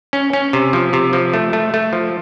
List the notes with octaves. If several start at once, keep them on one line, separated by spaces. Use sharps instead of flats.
C#4
C#4
C3
F3
C3
F3
A3
A3
A3
F3